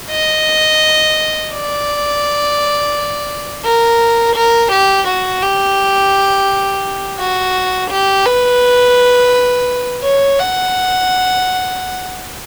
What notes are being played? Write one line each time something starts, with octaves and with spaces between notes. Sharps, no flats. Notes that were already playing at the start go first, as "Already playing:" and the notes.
D#5
D5
A#4
A#4
G4
F#4
G4
F#4
G4
B4
C#5
F#5